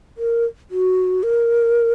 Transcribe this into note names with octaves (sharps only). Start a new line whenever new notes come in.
A#4
F#4
A#4